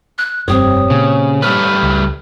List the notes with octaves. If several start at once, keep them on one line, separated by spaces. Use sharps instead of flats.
F#6
F1 G2 C4 G4 C#5 D#6
A#2 C#3
G3 A3 B4 F6
C#2